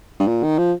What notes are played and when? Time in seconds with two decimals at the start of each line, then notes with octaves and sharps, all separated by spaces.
0.20 G2
0.27 A#2
0.43 D#3
0.58 F3